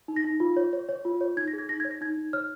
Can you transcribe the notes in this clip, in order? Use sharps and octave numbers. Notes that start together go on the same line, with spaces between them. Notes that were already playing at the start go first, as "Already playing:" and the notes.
D#4
A#6
D#4
F4
C#5
C#5
C#5
F4
C#5
D#4 G#6
A#6
G#4
G#6
D#4 A#6
C#5 G#6
A#6
D#4 G#6
D#4
C#5 F6